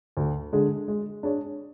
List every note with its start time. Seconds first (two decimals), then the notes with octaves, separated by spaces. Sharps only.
0.17 D2
0.53 D3 G#3 D4 G#4
0.88 G#3
1.23 D4 G#4 C#5